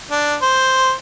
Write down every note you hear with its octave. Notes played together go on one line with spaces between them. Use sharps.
D4
C5